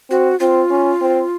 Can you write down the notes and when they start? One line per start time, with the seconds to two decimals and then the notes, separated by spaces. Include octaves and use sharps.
0.10 C4 F#4
0.40 C4 F4
0.70 C#4
1.01 C4